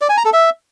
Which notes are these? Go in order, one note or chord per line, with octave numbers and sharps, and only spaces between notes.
D5
G#5
A#5
A4
E5